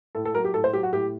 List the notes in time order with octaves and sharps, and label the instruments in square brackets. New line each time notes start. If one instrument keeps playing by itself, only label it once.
[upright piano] A2 A4
A4
F#3 A#4
G4
A2 A4
C5
F#3 G4
F#4
A2 G4